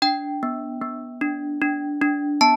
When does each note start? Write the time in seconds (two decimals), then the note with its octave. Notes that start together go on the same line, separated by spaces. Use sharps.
0.02 D4 G5
0.43 B3
0.82 B3
1.21 D4
1.62 D4
2.02 D4
2.41 B3 A5